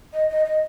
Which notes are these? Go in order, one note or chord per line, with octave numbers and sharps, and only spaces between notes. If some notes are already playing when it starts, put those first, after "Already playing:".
D#5
D#5
D#5